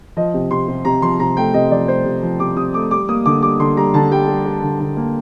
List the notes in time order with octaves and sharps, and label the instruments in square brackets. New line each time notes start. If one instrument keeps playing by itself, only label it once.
[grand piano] F3 D#5
C3
C3 C6
C3
C3 A#5
F3 C6
C3 A#5
A3 G5
C3 D#5
F3 D5
A3 C5
C3
F3
C3 D6
C3 D#6
A3 D6
G3 D6
A#3 D#6
D3 D6
G3 D6
D3 C6
G3 A#5
D3 A5
G3 G5
G3
G3
D3
D3
A#3